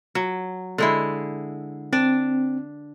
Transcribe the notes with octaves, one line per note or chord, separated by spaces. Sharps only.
F#3
D3 G#3 E4
C4 D4 D5